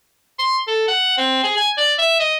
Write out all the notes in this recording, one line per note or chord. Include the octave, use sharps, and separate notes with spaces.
C6
A4
F#5
C4
G#4
G#5
D5
E5
D#5